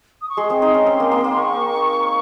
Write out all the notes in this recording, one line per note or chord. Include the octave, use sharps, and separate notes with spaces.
D#6
C#6
G#3 G#4 C6
C4 C5
D#4
C#4
C4
A#3
A#3
A#3
C#6